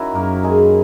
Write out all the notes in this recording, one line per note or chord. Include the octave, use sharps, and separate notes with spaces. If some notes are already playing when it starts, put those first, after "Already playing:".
Already playing: D#3 F#3 C#4 E4 F#4
F#2 A#3 A#4
G#3 G#4